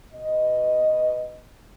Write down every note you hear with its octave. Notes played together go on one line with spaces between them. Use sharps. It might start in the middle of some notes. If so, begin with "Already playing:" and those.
B2 D#5